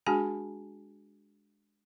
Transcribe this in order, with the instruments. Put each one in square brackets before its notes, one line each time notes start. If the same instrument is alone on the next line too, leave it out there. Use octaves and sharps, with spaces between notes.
[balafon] G#3 D4 F#4 G#4 G#5 A5